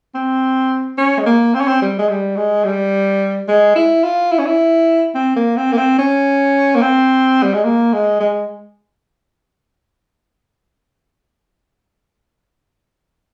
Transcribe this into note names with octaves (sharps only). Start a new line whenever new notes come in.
C4
C#4
G#3
A#3
C4
C#4
C4
G3
G#3
G3
G#3
G3
G#3
E4
F4
E4
C#4
E4
C4
A#3
C4
A#3
C4
C#4
A#3
C4
G3
G#3
A#3
G#3
G#3